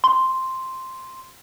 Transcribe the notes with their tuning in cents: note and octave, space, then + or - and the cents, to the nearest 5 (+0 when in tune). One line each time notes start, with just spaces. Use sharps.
C6 +0